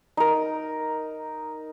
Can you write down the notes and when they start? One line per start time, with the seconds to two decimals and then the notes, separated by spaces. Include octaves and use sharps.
0.17 D#4 A#4